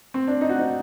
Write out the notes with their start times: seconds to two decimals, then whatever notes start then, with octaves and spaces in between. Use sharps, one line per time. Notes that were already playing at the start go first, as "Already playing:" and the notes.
0.14 C4
0.27 D4
0.41 D#4
0.49 F#4
0.59 D#4